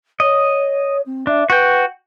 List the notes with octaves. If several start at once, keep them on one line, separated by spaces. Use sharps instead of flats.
C#5 D#5
C4
D4 E5
F#4 B4 G5